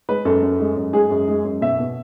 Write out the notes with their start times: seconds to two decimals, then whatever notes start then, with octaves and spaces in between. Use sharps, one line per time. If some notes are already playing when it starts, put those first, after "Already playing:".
0.09 G#3 B4
0.25 F#2 A4
0.42 F#2
0.60 G#3
0.77 F#2
0.93 G#3 G#4
1.10 F#2
1.28 G#3
1.44 F#2
1.61 B2 E5
1.79 B2